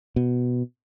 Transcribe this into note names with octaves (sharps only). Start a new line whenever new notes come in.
B2